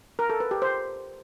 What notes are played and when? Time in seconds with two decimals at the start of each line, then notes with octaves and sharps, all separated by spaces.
0.19 A#4
0.30 A4
0.40 B4
0.51 G4
0.62 C5